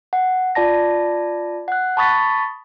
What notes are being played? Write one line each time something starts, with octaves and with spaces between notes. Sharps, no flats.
F#5
F4 D5 A5 A#6
F#5 F#6
A5 B5 C#6 D#6 A6 B6